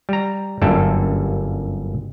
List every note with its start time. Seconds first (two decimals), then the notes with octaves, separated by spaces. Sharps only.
0.09 G3 A#5
0.62 G1 F#2 D3 G3 A#3 A4